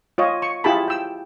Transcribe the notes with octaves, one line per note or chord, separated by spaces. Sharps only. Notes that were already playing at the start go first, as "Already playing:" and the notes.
F4 C#5 D#5
C#6
E4 F4 G4 G#4 A5 B5
G5 E6